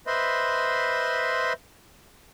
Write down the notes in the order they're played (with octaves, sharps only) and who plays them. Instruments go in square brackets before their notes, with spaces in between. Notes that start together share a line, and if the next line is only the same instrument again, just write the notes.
[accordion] B4 C5 D#5 E5 B5 C6